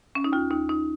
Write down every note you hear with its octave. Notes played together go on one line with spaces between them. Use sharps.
C#4
D#4
D#2 F4
D#2 D#4
D#2 D#4